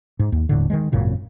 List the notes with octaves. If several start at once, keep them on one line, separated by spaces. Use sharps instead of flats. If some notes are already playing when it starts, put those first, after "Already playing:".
G#2
D#2
D#1 A2 D3
D#3 F#3 G#3
G#1 F#2 A#2 C#3